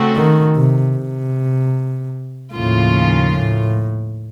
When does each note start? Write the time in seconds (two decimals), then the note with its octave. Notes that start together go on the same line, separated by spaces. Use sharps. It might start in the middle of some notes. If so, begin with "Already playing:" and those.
Already playing: C#3 A3 C4 F#4 A4
0.16 D#3
0.56 C3
0.96 C3
2.53 D#2 A2 C#3 F3 A#3 F4
3.32 A2